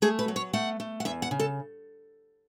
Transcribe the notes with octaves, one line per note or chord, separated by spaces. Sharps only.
A3 G#4
B4
F#3
C#5
A3 F#5
A3
F#5
E2 E5
F#5
C#3
A4